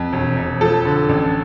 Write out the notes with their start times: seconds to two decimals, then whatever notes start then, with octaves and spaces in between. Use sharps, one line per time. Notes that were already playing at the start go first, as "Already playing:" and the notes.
Already playing: F2
0.13 E1
0.37 E1
0.61 F3 A4
0.85 D3
1.09 A1